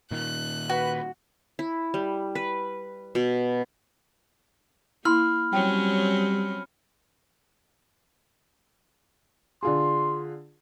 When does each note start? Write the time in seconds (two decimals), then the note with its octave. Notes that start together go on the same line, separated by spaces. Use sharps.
0.11 A#2 D#3 F#6
0.69 F#4 B4
1.59 E4
1.94 G3
2.35 B4
3.15 B2
5.05 A#3 E4 B5 C6 F6
5.53 F#3 G3 C4 C#4 G5
9.63 D3 F4 G#4 C6